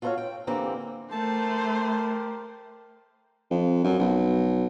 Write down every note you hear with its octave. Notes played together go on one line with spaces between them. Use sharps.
F4 F#4 A4 B4 C#5 F5
G5
D3 E3 A#3 C4 G4
A3 G4 A#4 C5 A5
F2
F#2
B1